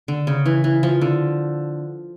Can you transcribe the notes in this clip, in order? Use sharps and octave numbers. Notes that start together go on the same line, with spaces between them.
D3
C#3
E3
E3
F3
D3